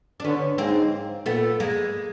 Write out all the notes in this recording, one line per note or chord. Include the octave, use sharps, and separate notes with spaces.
D4
D3 B3 C#4
G#2 A#3 C4
A#2 A3 B3
G#3 A#3